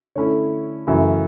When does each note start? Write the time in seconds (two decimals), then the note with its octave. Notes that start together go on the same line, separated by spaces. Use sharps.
0.15 D3 A3 C#4 E4 C#5
0.87 F#2 C#3 E3 A3 E4